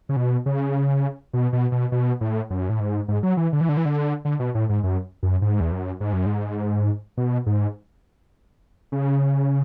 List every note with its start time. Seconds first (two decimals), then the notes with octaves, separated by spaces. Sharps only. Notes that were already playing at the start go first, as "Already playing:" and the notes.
0.09 C#3
0.16 B2
0.46 C#3
1.33 B2
1.53 B2
1.72 B2
1.92 B2
2.21 A2
2.50 F#2
2.69 A2
2.80 G#2
3.08 G#2
3.23 F#3
3.37 E3
3.53 D3
3.61 E3
3.69 D3
3.77 E3
3.85 D3
4.25 D3
4.40 B2
4.55 A2
4.69 G#2
4.83 F#2
5.23 F#2
5.42 G#2
5.60 E2
5.72 F#2
6.00 G#2
6.13 F#2
6.26 G#2
7.17 B2
7.46 G#2
8.92 C#3